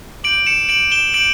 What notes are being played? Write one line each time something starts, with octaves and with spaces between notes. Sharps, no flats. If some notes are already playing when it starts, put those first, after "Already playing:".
D6 G6 D7 F#7
C#7 E7
D7 F#7
E7 G7
D6 G6 D7 F#7